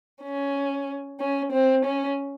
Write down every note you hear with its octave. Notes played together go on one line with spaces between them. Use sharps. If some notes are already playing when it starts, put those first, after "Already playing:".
C#4
C#4
C4
C#4